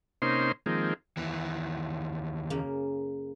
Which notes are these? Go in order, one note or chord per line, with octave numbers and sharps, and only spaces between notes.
C3 A#3 C#4 D#4 C5 C6
D#3 F3 G#3 A#3 C4
D#2 E3
F#2 C#3 A#3